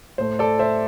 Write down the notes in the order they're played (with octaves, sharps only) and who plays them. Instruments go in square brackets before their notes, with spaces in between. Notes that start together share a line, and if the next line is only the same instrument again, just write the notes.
[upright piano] A2 A3 C5
A4 D5
C5 E5